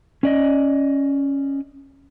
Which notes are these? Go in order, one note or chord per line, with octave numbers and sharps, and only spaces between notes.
C#4 D5 D#5